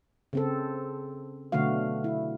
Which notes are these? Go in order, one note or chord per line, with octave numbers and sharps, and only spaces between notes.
C#3 C4 A4
B2 D3 F#3 A3 F#4 F5
E4